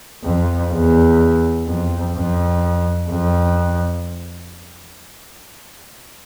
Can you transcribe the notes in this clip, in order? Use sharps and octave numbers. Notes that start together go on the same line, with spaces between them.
F2
E2
F2
F2
F2